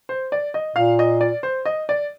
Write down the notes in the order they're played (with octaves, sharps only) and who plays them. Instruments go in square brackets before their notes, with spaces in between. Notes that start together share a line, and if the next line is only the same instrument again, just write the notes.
[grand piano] C5
D5
D#5
[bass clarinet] A#2 [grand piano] F5
[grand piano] D#5
D5
C5
D#5
D5